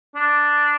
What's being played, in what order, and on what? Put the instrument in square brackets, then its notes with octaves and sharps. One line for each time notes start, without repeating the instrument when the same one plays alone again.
[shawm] D4